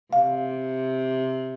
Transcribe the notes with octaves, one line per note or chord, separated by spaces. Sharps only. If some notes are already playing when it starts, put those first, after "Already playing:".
C3 F5